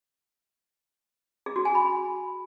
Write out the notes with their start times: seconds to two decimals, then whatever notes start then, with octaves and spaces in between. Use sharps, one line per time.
1.46 G#4
1.56 F#4
1.65 G#5
1.75 B5